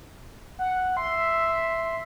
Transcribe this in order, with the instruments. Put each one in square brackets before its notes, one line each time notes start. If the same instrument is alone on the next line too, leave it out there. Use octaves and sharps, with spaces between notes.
[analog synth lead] F#5
[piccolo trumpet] E5 [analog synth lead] C6